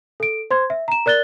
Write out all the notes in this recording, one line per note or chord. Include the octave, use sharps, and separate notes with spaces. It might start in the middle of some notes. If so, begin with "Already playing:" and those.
A4 D7
C5 C6 G#6
E5
A#5 E7
A#4 D5 F#6 A6 G7